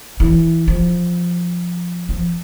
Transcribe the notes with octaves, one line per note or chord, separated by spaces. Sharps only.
E3
F3
F3